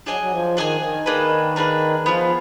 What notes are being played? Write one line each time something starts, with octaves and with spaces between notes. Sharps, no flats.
F#3 D4 G#4 D#5 G#5
F#3
F3
D#3 D4 G#4 D#5 G#5
D#3
A#3 D4 G#4 B4
A#3 D4 G#4 B4
D#3
F3 B3 F4 G#4